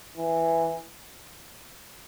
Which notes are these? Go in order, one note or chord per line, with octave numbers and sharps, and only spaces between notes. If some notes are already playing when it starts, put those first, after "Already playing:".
E3